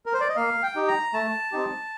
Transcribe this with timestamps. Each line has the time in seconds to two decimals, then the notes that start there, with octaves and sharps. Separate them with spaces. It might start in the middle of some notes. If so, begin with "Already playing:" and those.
0.06 A#4
0.13 C5
0.20 D5
0.29 D#5
0.36 A#3 F5
0.63 G5
0.76 D#4 G4
0.88 A#5
1.13 A3 A5
1.52 C4 D#4 G4